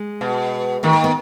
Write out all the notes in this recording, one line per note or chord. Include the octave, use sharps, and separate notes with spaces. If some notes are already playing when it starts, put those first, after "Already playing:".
Already playing: G#3
B2
D#3 A#3
A#3
B3